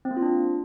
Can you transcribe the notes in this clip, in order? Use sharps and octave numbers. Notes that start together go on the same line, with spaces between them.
C4
A#3
F4
D4